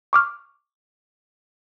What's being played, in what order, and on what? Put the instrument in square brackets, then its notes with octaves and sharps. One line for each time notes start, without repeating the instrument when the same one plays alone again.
[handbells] C#6 D6 F6